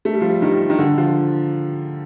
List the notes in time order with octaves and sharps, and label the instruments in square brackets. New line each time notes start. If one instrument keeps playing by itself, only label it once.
[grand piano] A3
G3
F3
G3
D#3
D#3
D3
F3